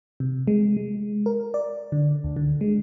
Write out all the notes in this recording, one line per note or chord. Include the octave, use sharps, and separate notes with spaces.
C3
G#3
G#3
A#4
D5
D3
D2
D3
G#3